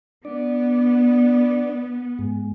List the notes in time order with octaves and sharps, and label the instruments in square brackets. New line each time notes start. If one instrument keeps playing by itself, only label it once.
[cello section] B3 [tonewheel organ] D4 D5
[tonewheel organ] G#2 G#3